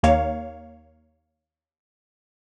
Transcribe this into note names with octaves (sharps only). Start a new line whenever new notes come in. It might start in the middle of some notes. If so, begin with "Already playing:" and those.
D#2 A#3 C#5 F5